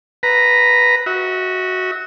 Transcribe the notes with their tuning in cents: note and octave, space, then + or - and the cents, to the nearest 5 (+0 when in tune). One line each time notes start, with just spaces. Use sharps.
B4 +0 A#5 +0
F#4 +0 E5 -40